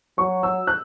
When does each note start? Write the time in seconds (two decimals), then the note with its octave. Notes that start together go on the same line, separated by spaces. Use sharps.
0.18 F#3 C#6
0.43 E6
0.67 F#6